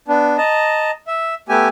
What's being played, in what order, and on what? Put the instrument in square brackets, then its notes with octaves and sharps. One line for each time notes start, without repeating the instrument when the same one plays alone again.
[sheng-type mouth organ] B3 D4
D#5 A5 A#5
E5
A3 B3 G4 G#5